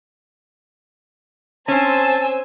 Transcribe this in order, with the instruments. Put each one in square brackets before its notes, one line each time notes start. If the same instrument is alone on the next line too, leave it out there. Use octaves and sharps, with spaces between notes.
[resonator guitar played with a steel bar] C4 C#4 [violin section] C5 G#5 E6 [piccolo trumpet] A5